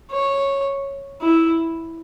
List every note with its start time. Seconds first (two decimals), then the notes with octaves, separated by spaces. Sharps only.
0.11 C#5
1.22 E4